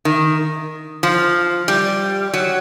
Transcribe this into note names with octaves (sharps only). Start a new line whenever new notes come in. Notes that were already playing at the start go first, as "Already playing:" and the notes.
D#3
F3
G3
F#3